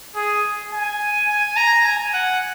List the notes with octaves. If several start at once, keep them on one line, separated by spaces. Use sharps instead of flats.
G#4
G#5
G#5
A#5
G#5
F#5